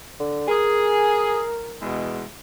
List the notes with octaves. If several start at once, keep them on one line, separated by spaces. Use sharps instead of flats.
D3
G#4 A#4
E2 B2 G#3